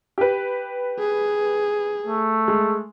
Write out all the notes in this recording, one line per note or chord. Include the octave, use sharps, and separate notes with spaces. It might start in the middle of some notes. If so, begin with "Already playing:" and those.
G4 B4
G#4
A3
G#3